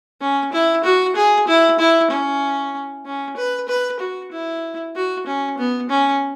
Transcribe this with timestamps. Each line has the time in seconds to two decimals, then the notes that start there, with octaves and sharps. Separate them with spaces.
0.21 C#4
0.53 E4
0.84 F#4
1.16 G#4
1.48 E4
1.79 E4
2.11 C#4
3.06 C#4
3.37 B4
3.68 B4
4.00 F#4
4.32 E4
4.95 F#4
5.27 C#4
5.58 B3
5.90 C#4